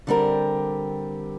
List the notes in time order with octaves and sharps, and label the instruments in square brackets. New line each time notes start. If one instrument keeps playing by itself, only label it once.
[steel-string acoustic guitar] D3 G3 C4 G4 A#4